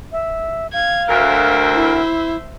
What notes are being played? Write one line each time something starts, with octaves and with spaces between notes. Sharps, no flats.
E5
F5 G#6
D2 A#4 C5 E5
E4